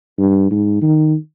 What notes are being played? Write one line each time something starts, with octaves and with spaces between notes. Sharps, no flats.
G2
G#2
D#3